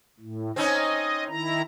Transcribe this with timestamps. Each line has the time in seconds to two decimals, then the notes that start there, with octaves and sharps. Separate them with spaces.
0.20 A2
0.56 C4 C#4 D#4 D#5
1.29 D#3 E4 A#5